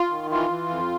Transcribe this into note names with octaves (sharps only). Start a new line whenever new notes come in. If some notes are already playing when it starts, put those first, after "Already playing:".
Already playing: F4
D#3
E3 F4
E3
F2